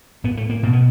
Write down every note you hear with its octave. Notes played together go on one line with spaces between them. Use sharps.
A2 B3
A3
A#3
B2 A#3
B3